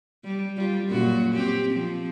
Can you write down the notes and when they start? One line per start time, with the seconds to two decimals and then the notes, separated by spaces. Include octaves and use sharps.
0.24 G3
0.57 G3 F4
0.88 F#2 A#2 F#4
1.35 C4 G4
1.71 F3 C4